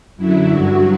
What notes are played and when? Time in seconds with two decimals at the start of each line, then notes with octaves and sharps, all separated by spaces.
0.17 F#2 D3 F#3 E4
0.50 G2 F#3 F#4